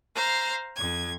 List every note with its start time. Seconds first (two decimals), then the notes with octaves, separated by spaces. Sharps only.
0.15 C5 F5 A#5
0.75 F2 G#6